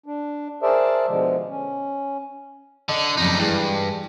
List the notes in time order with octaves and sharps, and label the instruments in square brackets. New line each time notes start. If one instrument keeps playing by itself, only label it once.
[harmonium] D4
G#4 A#4 C5 D5 E5 A5
B2 D3 F3 G#3
C#4
[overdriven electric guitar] D3 [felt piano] D#5
[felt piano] F#1 F2 [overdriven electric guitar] G3 D#4
[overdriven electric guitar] G2 [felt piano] E3 G#3